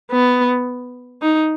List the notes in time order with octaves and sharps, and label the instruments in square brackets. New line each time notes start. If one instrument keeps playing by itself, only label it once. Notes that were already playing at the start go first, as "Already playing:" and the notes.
[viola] B3
D#4